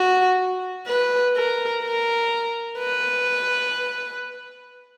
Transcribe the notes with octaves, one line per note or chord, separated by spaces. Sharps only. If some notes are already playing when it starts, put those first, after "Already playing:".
Already playing: F#4
B4
A#4
A#4
B4